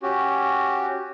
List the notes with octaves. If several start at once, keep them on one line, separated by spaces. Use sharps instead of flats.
C#4 F#4 G4